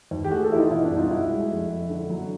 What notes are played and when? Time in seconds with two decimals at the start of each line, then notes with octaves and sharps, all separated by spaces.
0.11 D#2
0.24 G4
0.31 A3 F#4 G#4
0.43 G4 A4
0.50 E3 E4
0.57 D#4 F4
0.70 B2 E4 F#4
0.83 D4 E4
0.91 C2
0.97 D#4 F4
1.10 C2 E4 F#4
1.30 G#3
1.50 F2
1.70 F2
1.90 D3
2.10 F#3